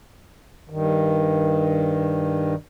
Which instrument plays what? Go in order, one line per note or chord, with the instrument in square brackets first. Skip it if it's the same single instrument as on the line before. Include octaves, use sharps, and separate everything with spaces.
[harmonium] G2 D#3